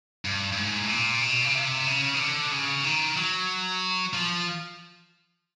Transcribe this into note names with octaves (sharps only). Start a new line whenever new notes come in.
G2
G2
G#2
A2
A#2
B2
C#3
C3
C#3
D#3
D3
C#3
D#3
F#3
F3